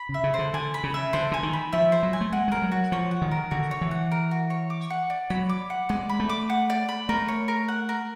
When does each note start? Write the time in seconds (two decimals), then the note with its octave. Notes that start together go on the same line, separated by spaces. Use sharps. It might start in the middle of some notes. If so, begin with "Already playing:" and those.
Already playing: B5
0.09 C#3
0.14 E5
0.24 C#3
0.34 D3 C5
0.54 D3 G#5
0.74 B5
0.83 C#3
0.94 E5
1.13 D3 C5
1.31 D3 G#5
1.43 D#3
1.53 B5
1.72 F3 E5
1.92 C5
2.03 F#3
2.13 G#5
2.21 A3
2.32 G#3 F#5
2.48 G#3
2.52 G3 A#4
2.62 F#3
2.72 F#4
2.92 F3 C#5
3.11 F#5
3.22 D#3
3.31 A#4
3.51 D3 F#4
3.71 C#5
3.81 E3
3.91 F#5
4.11 A#4
4.31 F#4
4.50 C#5
4.70 D6
4.90 F#5
5.10 D5
5.30 F#3 B5
5.49 D6
5.70 F#5
5.89 G#3 D5
6.09 B5
6.20 A3
6.29 D6
6.50 F#5
6.70 D5
6.89 B5
7.09 A3 A#4
7.28 C#5
7.48 A#4
7.68 F#5
7.89 A#4